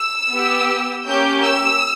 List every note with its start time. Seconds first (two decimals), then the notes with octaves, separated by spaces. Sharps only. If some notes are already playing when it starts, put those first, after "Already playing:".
Already playing: E6
0.31 B3 G4
1.06 A#3 C#4 G4 G6
1.44 E6